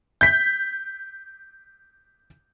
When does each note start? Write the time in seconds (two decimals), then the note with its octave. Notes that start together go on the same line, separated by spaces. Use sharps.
0.21 G6 B6